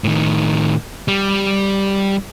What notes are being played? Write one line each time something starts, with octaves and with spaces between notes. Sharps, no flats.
A2 D#3
G3